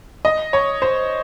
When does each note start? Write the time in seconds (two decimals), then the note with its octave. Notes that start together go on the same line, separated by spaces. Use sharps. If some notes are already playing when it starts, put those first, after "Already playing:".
0.25 D#5
0.53 C#5
0.82 C5